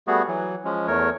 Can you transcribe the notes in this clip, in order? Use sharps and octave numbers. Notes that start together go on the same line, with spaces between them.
G3 A3 B3 F#4 G#4
E3 F#3
F3 G#3 C#4
E2 A3 A#4 C#5